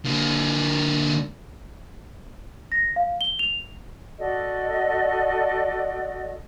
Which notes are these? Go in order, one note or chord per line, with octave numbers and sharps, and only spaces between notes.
D3 A#3
A#6
F5
G7
F7
F#4 A4 D5 D#5